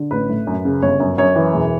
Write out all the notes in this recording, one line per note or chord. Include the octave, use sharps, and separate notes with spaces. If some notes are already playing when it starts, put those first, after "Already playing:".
Already playing: D3
A1 B4
A2
F#2
C#3
G1 C#5
F#2
F#2 C#5
E3
E1